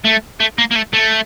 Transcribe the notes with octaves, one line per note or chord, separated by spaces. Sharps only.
A3
A3
A#3
A#3
A3
A3